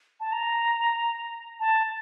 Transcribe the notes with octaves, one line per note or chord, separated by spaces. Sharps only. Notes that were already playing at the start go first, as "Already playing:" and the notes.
A5
A#5
A5